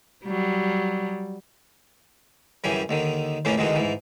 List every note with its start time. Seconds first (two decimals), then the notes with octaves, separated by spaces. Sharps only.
0.25 F#3 G3
2.64 F#2 C#3 E3 G3 G#5
2.89 D#2 D3 D#3
3.45 F2 A2 C#3 E3 A#3 C#4
3.58 E2 B2 D3 D#3 G#3 F#4
3.76 G#2 E3